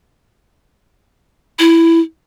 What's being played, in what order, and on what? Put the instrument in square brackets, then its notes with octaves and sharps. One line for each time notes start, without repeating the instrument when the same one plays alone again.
[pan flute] E4